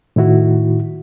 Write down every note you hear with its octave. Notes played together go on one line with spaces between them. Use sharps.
A2 D#3 E4 F#4